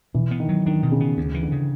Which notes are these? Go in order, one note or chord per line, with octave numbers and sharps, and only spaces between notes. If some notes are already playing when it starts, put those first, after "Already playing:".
B2 E3
B3
D#3
F#3
D#3 D4
B2
C#3
B3
D2 C#3
E3
D3
C#3